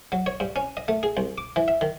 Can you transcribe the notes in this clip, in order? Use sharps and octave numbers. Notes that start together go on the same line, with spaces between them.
F#3
C#5
G2
C#4
D#5
A3
G#4
C2
D6
E3
E5
D#3